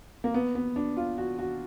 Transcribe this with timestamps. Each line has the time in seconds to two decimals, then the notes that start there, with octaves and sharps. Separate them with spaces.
0.24 A#3
0.34 B3
0.55 B3
0.76 D4
0.97 F4
1.18 F#4
1.39 F#4